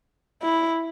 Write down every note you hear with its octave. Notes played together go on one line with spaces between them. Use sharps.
E4